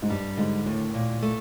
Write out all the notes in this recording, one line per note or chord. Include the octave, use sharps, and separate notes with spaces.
G#2
G2 G3
G#2 D3
D#2 A2
A#2
A3